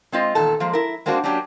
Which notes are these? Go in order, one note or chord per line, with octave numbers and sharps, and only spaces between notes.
G#3 C4 F4 D#5
E2 A#2 D#3 A4 A5
F3 G#3 A#3
E4 A#4
G#3 A#3 C4 D4 F#4
F#3 A#3 C#4 D4 G4